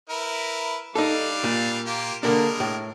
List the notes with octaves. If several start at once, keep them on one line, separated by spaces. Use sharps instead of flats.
E4 A#4 B4
G3 D4 D#4 A4 F5
A#2
A#3 F4 G4
D3 G3 G#3 A#3 D4 A#4
A2